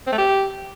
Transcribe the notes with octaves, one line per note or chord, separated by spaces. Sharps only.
C4
A3
G4